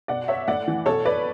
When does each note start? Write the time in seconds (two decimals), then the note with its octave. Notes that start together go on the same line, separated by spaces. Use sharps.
0.08 B2 D5 F#5
0.28 C#5 E5
0.48 A2 D5 F#5
0.68 E3
0.86 B2 A4 C#5
1.05 B4 D5